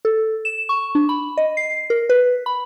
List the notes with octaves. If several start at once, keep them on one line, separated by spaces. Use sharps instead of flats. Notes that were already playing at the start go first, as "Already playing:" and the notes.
A4
E7
C#6
D4
B5
D#5
C7
A#4
B4
B5